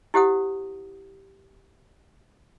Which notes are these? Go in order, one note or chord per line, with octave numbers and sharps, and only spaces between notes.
E4 G4 C5 F#5 D#6